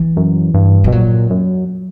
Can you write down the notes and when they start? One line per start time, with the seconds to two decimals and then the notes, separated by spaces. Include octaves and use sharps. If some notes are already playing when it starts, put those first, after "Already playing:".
Already playing: E3
0.17 F#2
0.54 G2
0.84 G3
0.88 B2
0.92 A#2 F#3
1.30 F#2